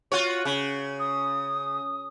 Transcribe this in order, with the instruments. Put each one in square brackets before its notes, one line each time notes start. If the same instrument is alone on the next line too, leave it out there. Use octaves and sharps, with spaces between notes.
[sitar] F4 F#4 C#5
C#3
[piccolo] D#6